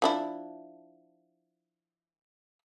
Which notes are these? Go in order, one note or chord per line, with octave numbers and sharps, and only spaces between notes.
F3 D4 E4